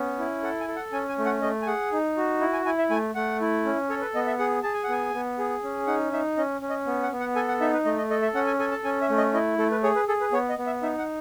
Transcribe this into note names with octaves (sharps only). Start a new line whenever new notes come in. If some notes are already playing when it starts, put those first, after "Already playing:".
Already playing: B3 C#4
E4
A4 F#5
G#5
A4
F#5
C#4 G#5
G#5
A3
F#5
A3 D#5
G#5
G#4 F#5
D#4
F#4
E4
G#5
E4 G#5
E5
A3 G#5
A3 F#5
E4
C#4
A4 C#5
B4
B3 D#5
E5
G#4 F#5
G#4 A5
G#5
F#5
B3 G#5
B3
G#4
C#4
D#4 F#5
D#4 E5
C#4 D#5
C#4
D#5
B3
F#5
B3
F#5
A4 G#5
F#5
D#4 E5
B4
A3 D#5
D#5
A4 D#5
E5
C#4 F#5
G#5
A4 G#5
A5
C#4 G#5
E5
A3
D#5
E4 D#5
A3 A4
B4
G#4 C#5
B4
G#4 A4
B4
B3 C#5
D#5
B3
E5
D#4 E5
F#5